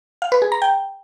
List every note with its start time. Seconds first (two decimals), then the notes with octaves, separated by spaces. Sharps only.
0.22 F5
0.32 B4
0.42 G#4
0.52 A#5
0.62 G5